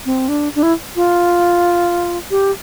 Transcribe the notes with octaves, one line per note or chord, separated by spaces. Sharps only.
C4
D4
D4
E4
F4
G4